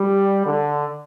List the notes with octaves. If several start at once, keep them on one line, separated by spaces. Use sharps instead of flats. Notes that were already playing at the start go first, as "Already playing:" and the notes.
Already playing: G3
D3